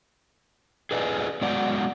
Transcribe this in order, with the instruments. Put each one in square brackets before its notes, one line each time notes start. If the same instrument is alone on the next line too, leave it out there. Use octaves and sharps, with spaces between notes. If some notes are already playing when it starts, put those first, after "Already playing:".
[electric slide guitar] G#4 A4 B4 D5 D#5 G#5
F#3 G#3 B3 D5 F#5